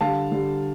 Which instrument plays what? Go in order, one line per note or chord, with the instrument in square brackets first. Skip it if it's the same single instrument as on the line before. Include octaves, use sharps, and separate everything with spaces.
[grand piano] D3 G3 F5 A5
D3 G3